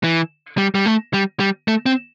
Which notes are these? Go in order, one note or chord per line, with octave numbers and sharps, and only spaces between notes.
E3
G3
G3
A3
G3
G3
A3
C4